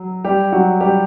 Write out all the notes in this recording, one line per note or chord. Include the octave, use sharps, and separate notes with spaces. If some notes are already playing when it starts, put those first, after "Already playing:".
Already playing: F#3
G3 G4
F#3 F#4
G3 G4